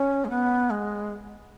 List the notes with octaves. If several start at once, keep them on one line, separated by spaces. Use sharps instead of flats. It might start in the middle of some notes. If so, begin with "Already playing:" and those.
Already playing: C#4
G#3
B3
G#3